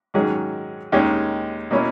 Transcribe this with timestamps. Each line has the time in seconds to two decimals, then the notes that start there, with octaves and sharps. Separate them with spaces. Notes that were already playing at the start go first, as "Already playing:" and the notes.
0.14 G#2 D#3 F#3 C#4 G#4
0.92 D#2 D#3 G#3 C#4
1.71 B2 A#3 C#4 E4